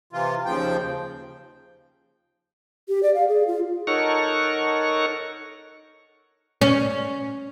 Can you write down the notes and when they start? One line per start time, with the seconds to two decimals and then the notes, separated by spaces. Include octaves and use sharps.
0.13 C3 E3 F4
0.45 D#2 C#3 F3 G5
2.89 G4
3.03 D5
3.15 F5
3.28 G#4
3.47 F4
3.87 D#4 A4 A#4 C#5 F#5 C#6
6.61 C#4